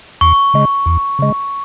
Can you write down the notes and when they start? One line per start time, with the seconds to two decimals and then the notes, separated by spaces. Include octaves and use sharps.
0.21 E2 C#6
0.54 C#3 G#3
0.86 E2
1.19 C#3 G#3